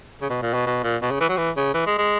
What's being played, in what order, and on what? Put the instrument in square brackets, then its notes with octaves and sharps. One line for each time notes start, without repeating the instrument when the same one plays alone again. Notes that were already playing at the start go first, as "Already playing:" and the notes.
[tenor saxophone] C#3
B2
A#2
B2
B2
A#2
B2
C#3
E3
F#3
E3
C#3
E3
G#3
G#3